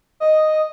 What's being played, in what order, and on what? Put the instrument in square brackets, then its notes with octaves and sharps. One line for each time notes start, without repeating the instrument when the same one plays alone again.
[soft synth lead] D#5